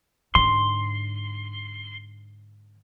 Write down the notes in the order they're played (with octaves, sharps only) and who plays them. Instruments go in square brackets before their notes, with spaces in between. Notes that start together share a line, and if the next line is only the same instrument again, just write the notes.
[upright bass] G#2 D3 [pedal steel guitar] C6